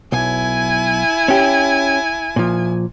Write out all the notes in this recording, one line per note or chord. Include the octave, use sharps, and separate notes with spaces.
B1 E4 G#5
C#4 G4
A#2 F3